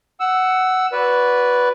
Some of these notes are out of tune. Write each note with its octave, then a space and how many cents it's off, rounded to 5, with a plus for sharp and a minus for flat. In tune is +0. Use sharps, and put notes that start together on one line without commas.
F#5 +10 E6 +0
F#4 +0 B4 +0 D5 -15